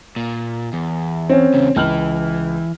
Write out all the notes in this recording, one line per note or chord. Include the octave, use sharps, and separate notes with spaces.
A#2
E2
C4 C#4
E2 C#3
C#2 E3 F6 F#7